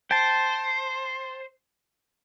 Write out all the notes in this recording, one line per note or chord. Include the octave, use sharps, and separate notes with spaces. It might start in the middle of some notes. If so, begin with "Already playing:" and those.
C5 G5 A5